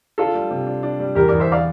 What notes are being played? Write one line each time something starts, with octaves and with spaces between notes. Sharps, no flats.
D4 F4 A4
G3
C3
D4
D4
G3
E2 G4 A#4
E2 A#4 D5
C5 E5
D5 F5